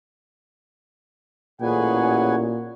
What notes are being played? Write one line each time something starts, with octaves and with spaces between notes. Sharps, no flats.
A1 A#2 G#4 B4 C#5 F#5 G#5